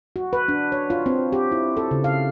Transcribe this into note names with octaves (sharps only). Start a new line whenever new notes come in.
F#4
B4
D4
C#5
F4
C4
G4
E4
A4
C#3
F5